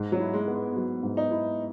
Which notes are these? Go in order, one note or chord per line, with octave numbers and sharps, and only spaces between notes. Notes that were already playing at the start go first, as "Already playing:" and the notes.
Already playing: G#2
F#3
E4
G#3
B3
G#3
F#3
G#2
D#4
E4